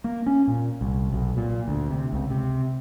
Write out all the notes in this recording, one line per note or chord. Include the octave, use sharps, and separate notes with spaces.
A#3
C#4
A#2
C2
B1
A#2
D2
C3
C#2
C3